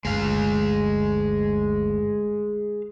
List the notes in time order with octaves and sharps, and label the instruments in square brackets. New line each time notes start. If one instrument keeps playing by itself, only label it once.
[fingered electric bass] G1 D2 [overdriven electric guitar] G#3 F5